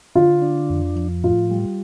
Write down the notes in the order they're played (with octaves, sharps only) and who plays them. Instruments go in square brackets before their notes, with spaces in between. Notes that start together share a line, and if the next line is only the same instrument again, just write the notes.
[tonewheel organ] D3 [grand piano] F4
[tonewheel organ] D4
F2
F3
[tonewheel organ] A2 [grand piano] F4
[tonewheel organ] G3